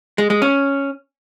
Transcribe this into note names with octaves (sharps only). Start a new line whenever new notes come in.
G#3
G#3
C#4